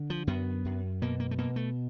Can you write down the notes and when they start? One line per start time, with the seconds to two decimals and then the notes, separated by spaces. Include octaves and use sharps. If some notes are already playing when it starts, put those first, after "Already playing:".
Already playing: D3
0.10 F3
0.27 F#2 B3
0.65 F#2
1.02 B2 A#3
1.20 A#3
1.31 A3
1.38 B2 A#3
1.56 A3